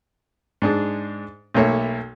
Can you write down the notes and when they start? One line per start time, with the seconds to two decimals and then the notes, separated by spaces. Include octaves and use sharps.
0.62 G#2 D4 G#4
1.54 B1 A3 A#3 C#5 E5